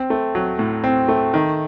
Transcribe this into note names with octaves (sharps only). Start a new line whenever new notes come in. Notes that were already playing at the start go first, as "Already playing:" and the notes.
Already playing: C4
A3
F#3
A2
C4
A3
D#3